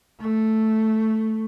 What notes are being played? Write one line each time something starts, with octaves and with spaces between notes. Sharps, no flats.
A3